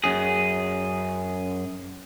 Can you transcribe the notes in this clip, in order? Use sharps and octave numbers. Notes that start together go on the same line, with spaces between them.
F#2 G#4